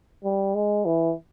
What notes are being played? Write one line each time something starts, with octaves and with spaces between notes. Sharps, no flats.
G3
G#3
E3